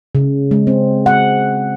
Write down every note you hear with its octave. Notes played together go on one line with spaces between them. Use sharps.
C#3
G#3
C4
F#5